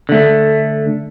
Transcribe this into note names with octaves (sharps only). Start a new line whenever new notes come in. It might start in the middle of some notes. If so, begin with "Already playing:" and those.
D3 A3